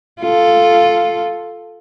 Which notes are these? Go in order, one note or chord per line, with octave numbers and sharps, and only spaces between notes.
F4 A4